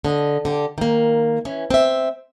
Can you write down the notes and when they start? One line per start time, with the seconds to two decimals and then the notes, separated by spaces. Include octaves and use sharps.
0.05 D3 D#5
0.45 D3 G4
0.78 D#3 A#3
1.45 E3 C#4
1.70 C4 E5